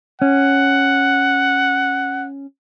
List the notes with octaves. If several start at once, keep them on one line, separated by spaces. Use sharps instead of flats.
C#4 F#5